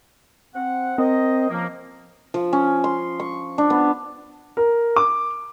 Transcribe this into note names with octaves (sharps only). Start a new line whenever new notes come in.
C4 F#5
C4 A#4 C5 D#5
C#2 F3 A#3
F3
C#4
C6
C#6
D4
B3
A#4
D6